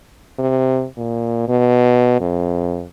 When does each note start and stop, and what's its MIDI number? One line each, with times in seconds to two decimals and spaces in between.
0.39 0.86 48
0.97 1.48 46
1.48 2.17 47
2.21 2.86 41